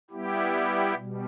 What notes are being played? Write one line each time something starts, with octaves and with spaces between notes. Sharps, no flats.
G3 B3 E4 G4
B2 G3